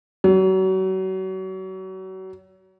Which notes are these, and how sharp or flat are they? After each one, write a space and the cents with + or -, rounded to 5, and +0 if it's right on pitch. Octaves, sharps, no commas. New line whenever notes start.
F#3 +35